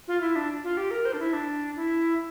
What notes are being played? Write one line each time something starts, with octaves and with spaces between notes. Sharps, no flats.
F4
E4
D4
F4
G4
A#4
C5
D4
E4
D4
E4